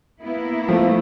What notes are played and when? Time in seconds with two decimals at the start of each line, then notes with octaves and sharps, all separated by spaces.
0.21 A#3 B3 E4
0.69 F3 A3